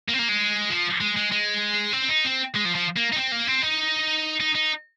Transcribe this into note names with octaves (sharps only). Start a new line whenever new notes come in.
A#3
C4
A#3
G#3
F3
G#3
G#3
G#3
C4
D#4
C4
G#3
F3
F3
A#3
D#4
C4
A#3
C4
D#4
D#4
D#4